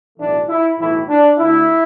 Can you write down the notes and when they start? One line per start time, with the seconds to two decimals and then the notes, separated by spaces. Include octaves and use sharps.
0.18 B1 A2 E3 A3 D4
0.49 E4
0.79 B1 A2 E3 A3 E4
1.09 D4
1.38 D2 D3 A3 E4